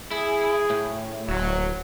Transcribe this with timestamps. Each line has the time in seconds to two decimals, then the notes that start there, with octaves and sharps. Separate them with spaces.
0.11 E4 G#4
0.70 A2
1.29 D1 F#3